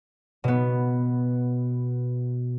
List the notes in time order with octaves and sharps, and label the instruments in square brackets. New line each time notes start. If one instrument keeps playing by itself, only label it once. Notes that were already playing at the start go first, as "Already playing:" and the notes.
[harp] B2 B3